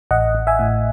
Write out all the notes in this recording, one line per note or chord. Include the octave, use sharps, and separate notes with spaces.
A1 D#5 F#5
A1
E5 G#5
A2